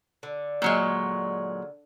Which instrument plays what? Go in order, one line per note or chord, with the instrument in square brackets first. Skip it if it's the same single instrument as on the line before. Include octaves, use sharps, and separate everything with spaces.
[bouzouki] D3
[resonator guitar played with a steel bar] A#2 F#3 G#3